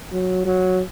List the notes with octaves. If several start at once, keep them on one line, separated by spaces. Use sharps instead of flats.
F#3
F#3